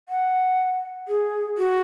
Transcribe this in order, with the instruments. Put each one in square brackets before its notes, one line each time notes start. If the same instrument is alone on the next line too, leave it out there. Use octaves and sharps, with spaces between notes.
[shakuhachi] F#5
G#4
F#4